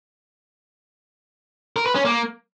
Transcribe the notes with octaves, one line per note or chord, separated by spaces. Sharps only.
A#4
B4
C#4
A#3